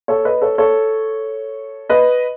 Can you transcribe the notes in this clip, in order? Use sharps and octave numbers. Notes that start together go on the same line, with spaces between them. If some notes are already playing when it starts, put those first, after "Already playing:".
A4 C#5
B4 D#5
A4 C#5
A4 C#5
B4 D#5